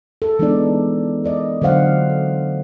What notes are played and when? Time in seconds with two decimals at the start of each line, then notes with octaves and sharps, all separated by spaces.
0.22 A4
0.39 E3 G#3 B3 D4 D#4 D5
1.24 A#4 D5 D#5
1.62 D3 F#3 C5 F5 F#5
2.10 A4